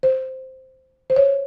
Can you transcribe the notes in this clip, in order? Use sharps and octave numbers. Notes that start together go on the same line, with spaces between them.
C5
C5
C#5